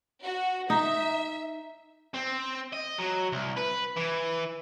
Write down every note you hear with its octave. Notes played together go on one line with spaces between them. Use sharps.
F#4
D#4 E5
C4
D#5
F#3
C2
B4
E3